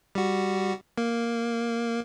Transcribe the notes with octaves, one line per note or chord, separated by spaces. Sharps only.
G3 F#4
A#3